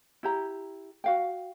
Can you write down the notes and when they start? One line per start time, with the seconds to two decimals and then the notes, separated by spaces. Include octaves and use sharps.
0.23 E4 G4 A#5
1.04 F#4 F5 G5